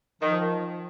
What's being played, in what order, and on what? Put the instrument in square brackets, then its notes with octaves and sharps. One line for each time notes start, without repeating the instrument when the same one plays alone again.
[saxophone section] D#3 [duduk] F3